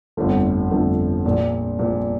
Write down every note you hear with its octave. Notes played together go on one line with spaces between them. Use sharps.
G1 F2 D3 F3 A3
G1 F2 D3 F3 A3
A#1 A#2 F3
A#1 A#2 F3